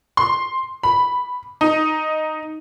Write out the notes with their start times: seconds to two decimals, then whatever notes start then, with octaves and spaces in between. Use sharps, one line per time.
0.17 C6
0.83 B5
1.61 D#4